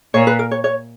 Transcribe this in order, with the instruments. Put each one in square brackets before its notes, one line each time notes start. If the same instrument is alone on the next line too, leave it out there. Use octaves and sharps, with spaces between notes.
[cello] A#2 [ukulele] C#5
[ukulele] B4
A#4
C#5
C#5